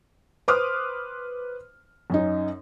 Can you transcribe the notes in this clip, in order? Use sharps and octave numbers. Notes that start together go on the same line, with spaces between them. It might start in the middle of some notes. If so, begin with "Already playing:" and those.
B4 C5 C6 D6 D#6 F6
F#2 C#4 D#4